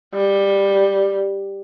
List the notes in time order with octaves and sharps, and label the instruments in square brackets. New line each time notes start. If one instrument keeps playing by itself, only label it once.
[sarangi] G3